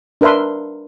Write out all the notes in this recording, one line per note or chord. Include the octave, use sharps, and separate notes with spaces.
D4 A#4 B4 E5 C6